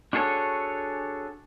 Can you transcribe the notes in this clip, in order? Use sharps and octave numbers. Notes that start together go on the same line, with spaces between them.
D4 F#4 G#4 A4 C#5